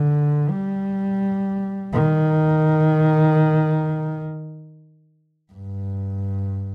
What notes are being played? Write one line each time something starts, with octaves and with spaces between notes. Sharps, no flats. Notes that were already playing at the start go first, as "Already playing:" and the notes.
Already playing: D3
G3
D#3
G2